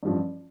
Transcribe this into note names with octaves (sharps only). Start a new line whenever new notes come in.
A1 G2 F3